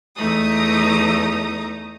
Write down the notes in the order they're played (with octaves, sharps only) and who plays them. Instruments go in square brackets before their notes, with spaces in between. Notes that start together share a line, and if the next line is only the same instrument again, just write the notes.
[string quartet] E2 A3 D#4 A#5 D#6